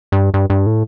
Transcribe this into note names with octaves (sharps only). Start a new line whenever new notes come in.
G2
G2
G2
A2